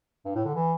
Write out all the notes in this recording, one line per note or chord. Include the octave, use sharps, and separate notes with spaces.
G2
A2
D3
E3